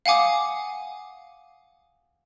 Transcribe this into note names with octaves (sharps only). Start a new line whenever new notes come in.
F5 F#5 G#5 D6 D#6